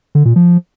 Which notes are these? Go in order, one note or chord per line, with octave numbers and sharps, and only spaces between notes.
D3
A#2
F3